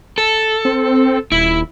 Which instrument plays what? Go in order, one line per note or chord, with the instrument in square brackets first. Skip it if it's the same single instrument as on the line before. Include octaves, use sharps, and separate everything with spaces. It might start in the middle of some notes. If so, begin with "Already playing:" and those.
[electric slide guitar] A4
[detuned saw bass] C4
[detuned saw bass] D#1 [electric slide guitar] E4